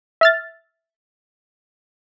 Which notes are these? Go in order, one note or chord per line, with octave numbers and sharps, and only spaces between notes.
E5 F6 A6